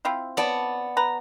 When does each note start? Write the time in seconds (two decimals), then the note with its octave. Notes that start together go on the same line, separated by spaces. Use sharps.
0.05 C4 E4 F4
0.37 B3 D5 A5
0.97 B4 A#5